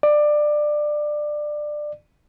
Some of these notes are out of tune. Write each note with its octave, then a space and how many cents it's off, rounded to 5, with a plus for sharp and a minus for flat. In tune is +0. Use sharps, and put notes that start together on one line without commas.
D5 +20